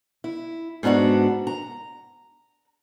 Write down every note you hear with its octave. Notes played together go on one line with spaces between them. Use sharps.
E4
G#2 B3 D4 F4 F#4
A#5